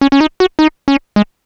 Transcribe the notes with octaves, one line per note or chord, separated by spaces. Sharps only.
C#4
C#4
D#4
F#4
D#4
C#4
G#3